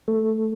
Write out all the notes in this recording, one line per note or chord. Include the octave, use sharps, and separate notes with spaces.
A3